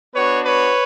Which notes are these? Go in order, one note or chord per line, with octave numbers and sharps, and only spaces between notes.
B3 D4 F#4 B4 C#5
B4 C#5